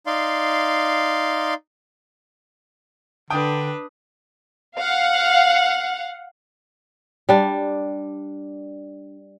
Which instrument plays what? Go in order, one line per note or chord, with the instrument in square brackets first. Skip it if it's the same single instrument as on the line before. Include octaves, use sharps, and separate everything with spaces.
[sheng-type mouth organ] D#4 D5 F5 C6
[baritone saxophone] D3 [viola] D4 B4 [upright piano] G5 D#6
[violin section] F5 F#5
[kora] G3 D4